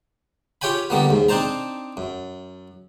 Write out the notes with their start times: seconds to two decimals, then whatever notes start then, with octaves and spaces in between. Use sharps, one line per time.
0.61 F4 G4 C#5 G5 G#5 B5
0.90 D3 G3 A#3 B3
1.09 D#2 G#2
1.29 C4 D4 D#4 C5 A5 A#5
1.97 F#2